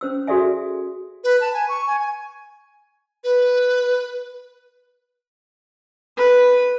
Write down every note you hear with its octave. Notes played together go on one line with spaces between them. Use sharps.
C#4 C5 E6
F#4 G#4 A4 D5 E5 G#5
B4
A5
G#5
C#6
G#5
G#5
B4
B4